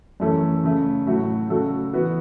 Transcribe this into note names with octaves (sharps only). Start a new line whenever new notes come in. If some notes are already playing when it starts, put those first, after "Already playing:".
F#2 E3 A3 C#4 A4
C#3 A3 C#4
A2 F#3 A3 F#4
C#3 F#3 A3 F#4 A4
E3 B3 F#4 B4